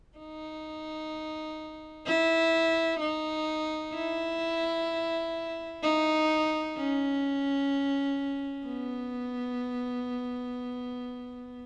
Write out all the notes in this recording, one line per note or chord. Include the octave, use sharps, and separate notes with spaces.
D#4
E4
D#4
E4
D#4
C#4
B3